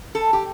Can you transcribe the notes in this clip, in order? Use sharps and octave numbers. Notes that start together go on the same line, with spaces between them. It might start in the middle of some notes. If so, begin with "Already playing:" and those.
A4
G4